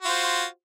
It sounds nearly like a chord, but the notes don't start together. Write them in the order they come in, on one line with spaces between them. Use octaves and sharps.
F#4 F4 C5